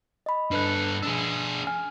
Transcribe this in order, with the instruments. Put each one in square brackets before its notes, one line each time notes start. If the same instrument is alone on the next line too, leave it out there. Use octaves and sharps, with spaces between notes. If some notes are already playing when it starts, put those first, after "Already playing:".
[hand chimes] D#5 B5
[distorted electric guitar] G2 A4 [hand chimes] D4 B4 F#6
[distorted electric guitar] D4 G#4 [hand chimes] E6
[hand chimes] G#5 F6